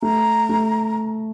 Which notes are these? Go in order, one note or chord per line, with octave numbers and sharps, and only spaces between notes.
A3 A#5
A3